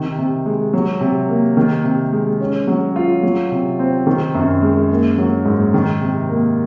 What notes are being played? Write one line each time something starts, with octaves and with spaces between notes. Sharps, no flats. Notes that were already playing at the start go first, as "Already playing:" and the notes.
Already playing: C3 D#3
C3
G#3
F#3
C3
A#3
D#3
C3
G#3
C#4
F#3
F4
F#3
C3
C4
D#3
F#2
G#3
A#3
F#3
G#2
D#3
C3
A#3